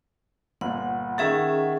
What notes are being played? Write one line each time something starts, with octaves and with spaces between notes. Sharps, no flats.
G1 A#2 F#5
D#3 C#4 G#4 E5 F#5 A6